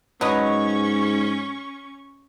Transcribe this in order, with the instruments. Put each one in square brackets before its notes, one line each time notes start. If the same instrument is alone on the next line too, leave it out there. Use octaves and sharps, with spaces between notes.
[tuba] G#2 [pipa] F#3 B4 D#5 [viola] C#4 C#6